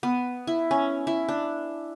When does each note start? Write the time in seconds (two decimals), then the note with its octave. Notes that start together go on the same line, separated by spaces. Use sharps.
0.03 B3
0.47 E4
0.71 C#4
1.07 E4
1.29 D4